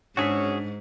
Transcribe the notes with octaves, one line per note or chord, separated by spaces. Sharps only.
G#2 C#4 D4 F#4 G#4 E6 B6